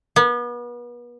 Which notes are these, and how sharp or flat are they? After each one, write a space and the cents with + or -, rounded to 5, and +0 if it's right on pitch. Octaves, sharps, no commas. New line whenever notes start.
B3 -35